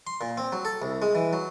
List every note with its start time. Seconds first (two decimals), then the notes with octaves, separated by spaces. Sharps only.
0.07 C6
0.21 A#2
0.38 C4
0.52 F#3
0.65 A4
0.82 C2
1.02 G#3
1.15 E3
1.33 F#3